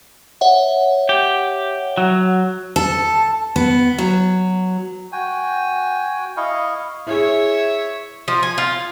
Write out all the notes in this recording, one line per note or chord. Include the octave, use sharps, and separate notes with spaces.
C#5 E5 F#5
G4
F#3
A4
B3
F#3
F#4 G5 G#5
E4 D#5 F5 C#6
E4 G#4 C#5 E5
F3
G#5
F4